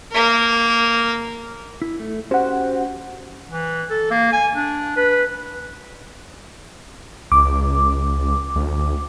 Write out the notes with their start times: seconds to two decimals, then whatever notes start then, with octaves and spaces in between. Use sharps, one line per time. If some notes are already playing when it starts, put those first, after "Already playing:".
0.12 A#3 A#4
1.82 E4
2.00 A3
2.31 C#4 F#4 G4 C5 F#5
3.51 E3
3.90 A4
4.11 A#3
4.33 G#5
4.55 D4
4.96 B4
7.32 C#2 D6
8.56 D2